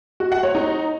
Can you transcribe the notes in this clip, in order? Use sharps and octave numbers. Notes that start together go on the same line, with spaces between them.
F#4
F#5
C#5
D#4